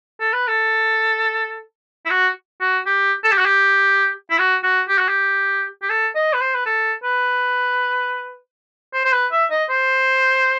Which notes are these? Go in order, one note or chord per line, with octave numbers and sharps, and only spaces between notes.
A4
B4
A4
E4
F#4
F#4
G4
A4
G4
F#4
G4
E4
F#4
F#4
G4
F#4
G4
G4
A4
D#5
B4
C5
B4
A4
B4
C5
C5
B4
E5
D#5
C5